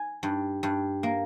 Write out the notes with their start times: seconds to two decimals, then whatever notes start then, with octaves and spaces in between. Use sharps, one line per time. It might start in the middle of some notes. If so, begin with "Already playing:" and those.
Already playing: G#5
0.23 G2
0.63 G2
1.03 A#3